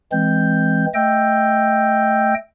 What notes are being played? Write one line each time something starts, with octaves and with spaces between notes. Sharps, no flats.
E3 G#3 C4 G6
A3 D#5 G5 E6 G6